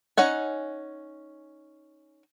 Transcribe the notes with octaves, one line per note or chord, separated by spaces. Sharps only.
C#4 D#4 C#5 F#5 G#5